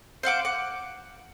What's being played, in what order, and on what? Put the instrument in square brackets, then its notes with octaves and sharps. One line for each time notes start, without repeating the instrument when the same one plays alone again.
[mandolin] C5 F5 F#5 D6
F#5 D6